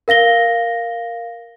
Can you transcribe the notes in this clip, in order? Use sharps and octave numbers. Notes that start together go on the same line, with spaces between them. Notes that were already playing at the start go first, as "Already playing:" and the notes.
A#4 F5 A#6 G7